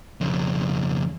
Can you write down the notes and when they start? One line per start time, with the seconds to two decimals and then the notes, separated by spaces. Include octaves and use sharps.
0.21 F2 C#3